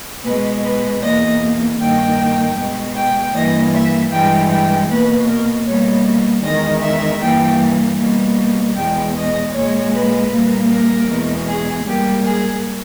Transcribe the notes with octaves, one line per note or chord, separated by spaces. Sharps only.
B2 G#3 B4
B4
E2 B2 A#3 D#5
G2 D#3 A#3 G5
B2 G#3
G5
G2 E3 A#3 D#5
E5
G2 E3 G#3 G5
G5
B2 A#3 B4
A#4
B2 G3 A#3 C#5
E2 D#3 G#3 D#5
E5
G2 E3 G3 A#3 G5
B2 G3 A#3
E2 B2 G#3 G5
D#5
A#2 G#3 C#5
B4
A#2 G3 A#3
A#4
E2 B2 G#3
G#4
G#2 G3 A#3 G4
G#4